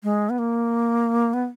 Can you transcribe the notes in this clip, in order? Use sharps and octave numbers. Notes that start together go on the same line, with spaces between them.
G#3
B3
A#3
B3